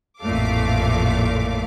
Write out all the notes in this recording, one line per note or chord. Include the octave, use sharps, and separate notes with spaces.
A1 F2 A#2 A3 F5 D6